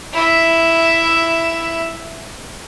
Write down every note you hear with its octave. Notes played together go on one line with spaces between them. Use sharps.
E4 E5